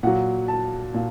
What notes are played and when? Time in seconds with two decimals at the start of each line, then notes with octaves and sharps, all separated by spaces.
0.03 A#2 F#3 F#5
0.48 A5
0.94 A#2